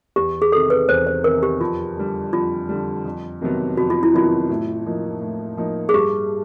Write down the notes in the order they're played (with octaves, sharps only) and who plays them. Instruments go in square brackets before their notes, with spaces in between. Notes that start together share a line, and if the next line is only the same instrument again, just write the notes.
[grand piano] E2 [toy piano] G4
[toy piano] G#4
[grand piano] C3 D#3 [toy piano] A4
[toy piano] B4
[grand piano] E2 [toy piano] C5
[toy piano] C5
[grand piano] C3 D#3 [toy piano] A#4
[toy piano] G4
[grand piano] F2 [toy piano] F4
[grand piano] D3 G3
[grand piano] F2 [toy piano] F4
[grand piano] D3 G3
F2
C3 D#3 F#3 B3
[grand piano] F2 [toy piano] F#4
[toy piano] F4
E4
[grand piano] C3 D#3 F#3 B3 [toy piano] F4
[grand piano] A2
F3 A#3 D#4
A2
F3 A#3 D#4
[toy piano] G#4
[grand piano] G2 [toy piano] G4